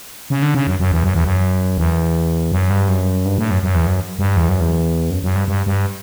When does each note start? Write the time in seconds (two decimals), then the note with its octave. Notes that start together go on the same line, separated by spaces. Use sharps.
0.30 C#3
0.42 D3
0.54 C#3
0.67 F#2
0.79 F#2
0.92 E2
1.04 F#2
1.14 E2
1.24 F#2
1.78 E2
2.52 F#2
2.70 G2
2.89 F#2
3.25 G2
3.38 A2
3.51 F#2
3.63 F#2
3.75 E2
3.87 F#2
4.19 G2
4.37 E2
4.49 F#2
4.60 E2
5.10 F#2
5.23 F#2
5.36 G2
5.48 G2
5.66 G2